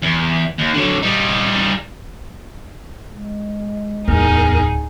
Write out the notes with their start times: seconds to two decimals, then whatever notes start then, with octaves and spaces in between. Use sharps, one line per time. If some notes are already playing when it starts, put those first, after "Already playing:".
0.02 E2
0.58 D#2
0.73 D3 F#3
1.02 G3 D#4
3.12 G#3
4.08 D1 E2 D#4 G#4 A#4